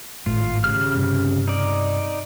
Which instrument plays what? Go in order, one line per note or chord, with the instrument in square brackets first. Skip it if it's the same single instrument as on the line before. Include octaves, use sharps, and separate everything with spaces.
[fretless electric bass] G#1 A2 A3 [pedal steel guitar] F4
[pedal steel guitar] C#3 G4 F6
[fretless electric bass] G2 C3
[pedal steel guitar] D#4 D5